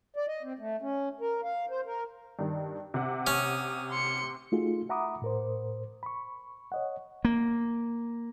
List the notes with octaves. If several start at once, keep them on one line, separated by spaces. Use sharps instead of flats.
D5
D#5
C4
A3
C#4
A#4
F5
C5
A#4
G2 D#3
C3 F#5
C#4 D#6
C6 C#7
A3 D#4 F4 F#4 G#4
E5 F#5 A#5 B5 D6 D#6
A2 A#4 C5
B5 C#6
C#5 D#5 F#5
A#3